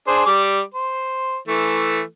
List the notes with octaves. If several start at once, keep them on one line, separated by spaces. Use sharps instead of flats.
D4 G#4 C5
G3 D6
C5
E3 A3